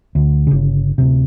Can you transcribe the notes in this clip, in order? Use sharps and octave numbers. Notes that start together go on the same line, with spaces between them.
D2
G1 C#3
D1 C3